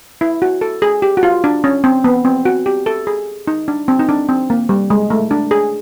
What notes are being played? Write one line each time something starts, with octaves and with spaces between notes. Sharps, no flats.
E4
F#4
A4
G#4
G4
F#4
F4
D4
C#4
C4
B3
C4
F#4
G4
A4
G#4
D#4
D4
C4
D#4
D4
C4
A#3
G3
G#3
A3
D4
G#4